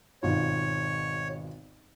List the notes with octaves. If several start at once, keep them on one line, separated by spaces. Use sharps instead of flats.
G#1 B2 F4 C#5